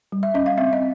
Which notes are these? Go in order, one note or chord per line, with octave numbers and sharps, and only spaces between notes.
G3
E5
C#4 D#5
F5
C4 E5
D#5